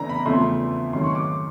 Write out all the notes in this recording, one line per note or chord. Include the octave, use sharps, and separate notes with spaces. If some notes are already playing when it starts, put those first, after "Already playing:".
Already playing: E2 C#3 E3 A3 D4 A#5
B5
E2 C#3 F3 A3 C6
G#2 D#3 F#3 A3 C#4 C6
C#6
D6